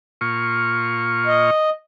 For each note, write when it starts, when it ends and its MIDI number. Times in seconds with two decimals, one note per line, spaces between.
0.21 1.50 46
0.21 1.50 65
0.21 1.50 85
1.27 1.70 75